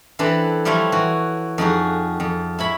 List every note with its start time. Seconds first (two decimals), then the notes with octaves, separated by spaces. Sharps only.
0.19 E3 C4 D4 A4 B4
0.65 F3 G3 E4 F4 C#5
0.92 E3 F#4
1.58 F2 D#4 F#4 G#4
2.20 F2
2.59 E4 C#5 B5